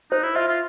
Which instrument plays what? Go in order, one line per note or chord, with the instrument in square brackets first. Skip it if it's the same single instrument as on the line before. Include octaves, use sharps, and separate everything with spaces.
[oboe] D#4 [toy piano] C5
[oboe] E4
[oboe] F4 [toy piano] E5
[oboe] F4